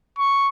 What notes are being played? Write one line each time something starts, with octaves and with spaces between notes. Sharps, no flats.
C#6